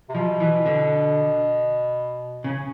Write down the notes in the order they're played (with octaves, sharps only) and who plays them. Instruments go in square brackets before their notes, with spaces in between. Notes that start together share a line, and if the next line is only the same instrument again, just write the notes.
[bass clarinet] C3
[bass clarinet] B2 [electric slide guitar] F3
[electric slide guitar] E3
D3
C#3